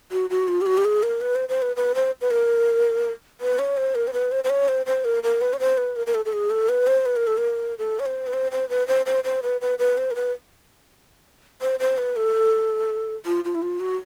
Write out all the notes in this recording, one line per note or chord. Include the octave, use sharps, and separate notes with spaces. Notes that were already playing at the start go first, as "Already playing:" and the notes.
F#4
F#4
F4
G4
F#4
G4
G#4
A#4
B4
C5
C5
B4
B4
C5
B4
A#4
B4
C#5
C5
A#4
C5
B4
C5
C5
C#5
C5
C5
A#4
A#4
B4
C#5
C5
B4
A#4
A#4
A4
A4
G#4
A4
B4
C5
B4
A#4
A4
A#4
A4
C#5
C5
B4
C5
C5
B4
C5
C5
C5
B4
B4
B4
C5
A#4
B4
C5
C5
B4
A4
F4
F4
E4
F4
F#4